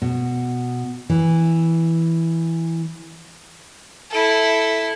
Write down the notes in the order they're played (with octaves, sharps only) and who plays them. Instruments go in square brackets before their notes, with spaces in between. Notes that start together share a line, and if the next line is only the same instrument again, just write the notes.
[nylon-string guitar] B2
E3
[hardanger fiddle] E4 A4